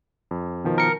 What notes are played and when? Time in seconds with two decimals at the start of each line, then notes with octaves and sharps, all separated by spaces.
0.31 F2
0.64 B2 D#3 F3
0.78 A#4 C#7